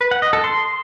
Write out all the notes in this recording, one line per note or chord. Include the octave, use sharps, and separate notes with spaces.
B4
F#5
D#5
A4
C6